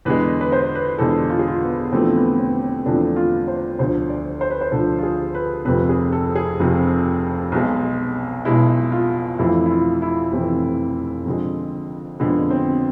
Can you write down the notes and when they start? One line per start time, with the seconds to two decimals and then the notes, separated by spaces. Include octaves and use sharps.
0.05 E2 D3 G#3 B4
0.41 B4
0.52 C5
0.75 B4
0.98 E2 D3 G#3 A4
1.29 F4
1.39 G#4
1.48 F4
1.61 B3
1.92 E2 D3 F3 A3 C4
2.16 B3
2.39 C4
2.63 C4
2.86 E2 D3 F3 A3 D4
3.16 F4
3.48 C5
3.79 D2 D3 F3 C5
4.10 D5
4.41 C5
4.50 B4
4.61 C5
4.72 D2 D3 F3 A4
4.99 F4
5.03 G#4
5.35 B4
5.65 F1 F2 C3 B4
5.89 G#4
6.12 A4
6.36 G#4
6.60 F1 F2 C3
7.52 B1 B2 G#3
8.45 B1 B2 G#3 E4
8.92 F4
9.39 F1 F2 E3 A3 E4
9.66 E4
9.71 F4
10.02 E4
10.32 F1 F2 E3 A3 C4
11.26 F2 D3 G#3
12.19 F2 D3 G#3 B3
12.50 C4